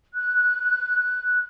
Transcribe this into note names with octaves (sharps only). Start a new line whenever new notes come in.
F#6